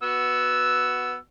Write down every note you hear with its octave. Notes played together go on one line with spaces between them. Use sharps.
B3 F#4 E6